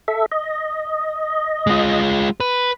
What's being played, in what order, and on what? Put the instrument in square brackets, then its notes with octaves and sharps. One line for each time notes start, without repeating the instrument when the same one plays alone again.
[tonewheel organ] A4 E5
D#5
[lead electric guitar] G#3 F4
B4